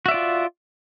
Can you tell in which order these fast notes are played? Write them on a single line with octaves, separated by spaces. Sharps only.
F#4 E5 D5 F4